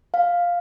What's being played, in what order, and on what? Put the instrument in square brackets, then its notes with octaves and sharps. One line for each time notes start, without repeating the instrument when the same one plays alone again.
[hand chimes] F5